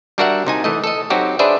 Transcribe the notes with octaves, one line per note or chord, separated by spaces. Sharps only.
G3 D4 F#4 A#4 E5 F#5
C3 D#4 G#5
E3 A3 D#5
A4 D#5
F#3 C4 D#4 F#4 G4
D4 G#4 B4 C5 D5 E5